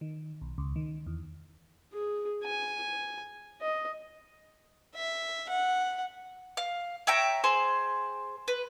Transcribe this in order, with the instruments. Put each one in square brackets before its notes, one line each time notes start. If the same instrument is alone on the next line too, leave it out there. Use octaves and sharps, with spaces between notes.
[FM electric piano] D#3
B1
C#2
D#3
E2
[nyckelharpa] G#4
G#5
D#5
[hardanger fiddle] E5
F#5
[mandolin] F5
C#5 E5 G5 A#5
G#4 C5 C6
B4